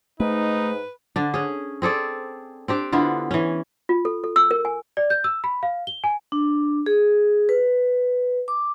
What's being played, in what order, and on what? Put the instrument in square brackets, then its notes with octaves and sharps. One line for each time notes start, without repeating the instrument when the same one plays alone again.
[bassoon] G#2 [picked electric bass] A3 [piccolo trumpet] D#4 [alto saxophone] B4
[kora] D3 D4
C#4 G#4
C4 G#4 A4 D5
C4 D4 G4
D3 B3 E4 F4
E3 C#4
[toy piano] F4
A4
A4
E6
A#4
G#5
[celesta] D5
G6
E6
B5
F5
G7
G#5
[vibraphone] D4
G#4
B4
D6